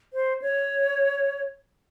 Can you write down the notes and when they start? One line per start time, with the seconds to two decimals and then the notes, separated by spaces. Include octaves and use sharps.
0.14 C5
0.42 C#5